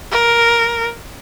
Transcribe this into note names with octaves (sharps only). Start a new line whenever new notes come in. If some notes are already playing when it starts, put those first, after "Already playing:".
A#4